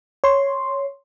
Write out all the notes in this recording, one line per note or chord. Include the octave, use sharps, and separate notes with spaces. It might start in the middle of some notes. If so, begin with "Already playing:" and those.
C#5 C6